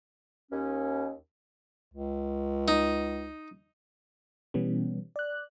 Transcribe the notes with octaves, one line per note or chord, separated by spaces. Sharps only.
D#2 C#4
C#2
D#4
B2 E3 G3 B3 C#4
D5 F#6